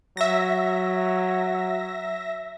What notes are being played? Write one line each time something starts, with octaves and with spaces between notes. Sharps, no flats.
F#3 E5 A#6